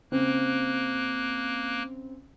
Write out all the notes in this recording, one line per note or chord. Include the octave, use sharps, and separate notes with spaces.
C#3 A#3 C4 F#6